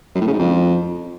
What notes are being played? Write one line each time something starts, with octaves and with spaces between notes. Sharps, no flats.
F#2
A2
C#3
G#2
F2